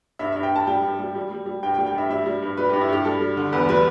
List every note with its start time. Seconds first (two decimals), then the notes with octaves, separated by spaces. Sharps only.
0.19 G2 E5
0.32 G2 E5
0.43 G5
0.51 G2 A5
0.67 G3 G5
0.83 G2
0.99 G3
1.15 G3
1.31 G3
1.46 G3
1.63 G2 G5
1.74 G5
1.78 G3
1.86 G5
1.95 G2 E5
2.09 G3 E5
2.26 G3
2.42 G2
2.57 G3 B4
2.69 G2 G4
2.81 E4
2.89 G2 G4
3.05 G3 A4
3.21 G3
3.37 D3
3.53 E2 B4
3.69 G3 B4